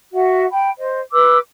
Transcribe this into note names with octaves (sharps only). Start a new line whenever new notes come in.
F#4 E5 F#5
G5 B5
C5 D#5
B4 D6 E6